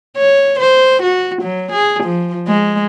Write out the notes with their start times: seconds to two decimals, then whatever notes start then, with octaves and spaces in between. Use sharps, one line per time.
0.17 C#5
0.60 C5
1.03 F#4
1.42 F#3
1.72 G#4
2.04 F3
2.48 G#3